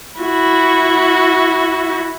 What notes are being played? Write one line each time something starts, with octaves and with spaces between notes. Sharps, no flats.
E4 F#4